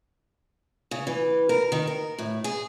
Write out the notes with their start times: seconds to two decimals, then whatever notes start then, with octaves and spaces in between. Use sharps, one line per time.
0.91 C#3
1.07 E3
1.49 A#4
1.72 D#3
1.87 A#4
2.19 A2
2.44 G#4